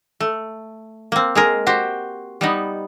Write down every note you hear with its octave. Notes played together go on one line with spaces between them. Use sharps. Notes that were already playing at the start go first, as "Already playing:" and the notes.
A3
A#3 C4
G#3 G#4 A#4
F#4 G4 C5
G3 B3 D#4